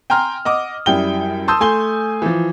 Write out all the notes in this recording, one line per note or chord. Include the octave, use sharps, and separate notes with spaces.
G5 G#5 A#5 C6 F6
D#5 F#5 D6 D#6
F#2 G3 E4 G5 G7
A5 C6 D#6 E6 G6
A3 G#5 C6 G7
E3 F3